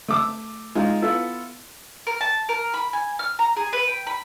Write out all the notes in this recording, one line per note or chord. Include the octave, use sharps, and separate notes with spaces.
A3 D6 E6
G#3 D#4 F4
B3 E4 F4 A4
A#4
A5
A#4
B5
G#5
F6
A#5
G#4
B4
G5
B5